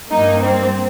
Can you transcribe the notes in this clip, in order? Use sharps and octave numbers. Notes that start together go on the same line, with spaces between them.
G2 G3 A#3 D#4
C4